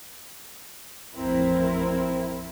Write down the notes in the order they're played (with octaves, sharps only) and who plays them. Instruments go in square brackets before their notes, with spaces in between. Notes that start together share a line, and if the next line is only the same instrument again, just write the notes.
[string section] A1 F2 C4 E4 A#4